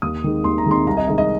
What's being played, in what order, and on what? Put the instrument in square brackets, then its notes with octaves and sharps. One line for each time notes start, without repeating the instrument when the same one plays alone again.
[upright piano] D#2 D#6
D#3 G#3
D#2 C6
A#5
D#3 G#3 C6
C2 A#5
D#5
C3 D#3 G#3 D#5
D#5